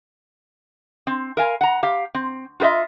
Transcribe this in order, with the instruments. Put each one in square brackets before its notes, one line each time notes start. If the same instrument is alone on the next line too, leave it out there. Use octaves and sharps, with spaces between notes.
[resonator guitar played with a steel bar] C4
A#4 F5 G#5
F#5 A#5
G4 F5
C4
F4 F#4 B4 D#5 E5